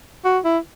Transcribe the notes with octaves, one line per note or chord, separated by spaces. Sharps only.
F#4
E4